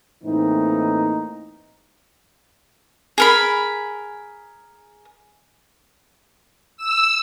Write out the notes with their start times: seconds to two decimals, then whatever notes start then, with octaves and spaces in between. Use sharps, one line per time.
0.24 A2 E3 A#3 C4 D#4
3.18 G#4 A#4 B5
6.77 E6